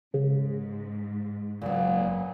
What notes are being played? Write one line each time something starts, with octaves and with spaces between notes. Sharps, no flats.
G#2 C#3
F#1 A#2 F#3 B3